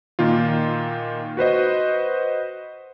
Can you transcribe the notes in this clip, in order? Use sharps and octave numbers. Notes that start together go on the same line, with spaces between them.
A#2 D#3 A#3 F4
F#4 B4 C5 D#5